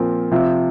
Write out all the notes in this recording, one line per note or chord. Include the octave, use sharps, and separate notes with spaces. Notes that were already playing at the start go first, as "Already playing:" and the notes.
Already playing: A#2 F3 C4 F4 A#4
C3 F3 C4 F4